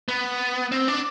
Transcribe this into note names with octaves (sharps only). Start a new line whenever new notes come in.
B3
C4
D4